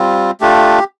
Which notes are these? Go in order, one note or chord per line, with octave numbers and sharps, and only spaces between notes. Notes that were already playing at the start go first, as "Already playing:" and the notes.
Already playing: G3 C4 F4
A3 D4 F4 G4